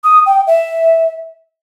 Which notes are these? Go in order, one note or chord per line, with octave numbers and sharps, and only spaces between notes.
D#6
G5
E5